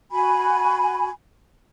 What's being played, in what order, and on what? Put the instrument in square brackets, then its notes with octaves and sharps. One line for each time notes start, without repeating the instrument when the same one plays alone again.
[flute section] F#4 G#5 B5